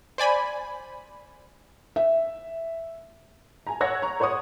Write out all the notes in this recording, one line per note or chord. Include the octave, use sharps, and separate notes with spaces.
C5 D5 G#5 B5
E5
G#5 A#5
C#5 F#5 E6 F#6 G#6 A#6
A#5 C#6
C5 C#5 F#5 C#6 D#6